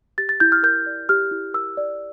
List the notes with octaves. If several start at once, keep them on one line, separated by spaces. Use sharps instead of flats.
G4 A6
A6
E4 G6
F6
A#4 G6
D5
G4 F6
E4
A#4 E6
D5